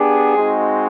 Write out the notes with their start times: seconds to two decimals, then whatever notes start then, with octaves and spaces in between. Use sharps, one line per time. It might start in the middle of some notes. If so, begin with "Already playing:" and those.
Already playing: B3 D4 G4 G#4
0.36 G#3 C4 D#4 F#4